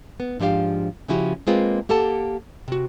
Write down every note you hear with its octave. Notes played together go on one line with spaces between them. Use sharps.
B3
G#2 F3 D4 G4 F5
C#3 F3 C#4 E4 F#4 G4
G#3 A#3 C4 F4 G#4 B4
A#3 G4 A4 F#5 A5
C3 F#4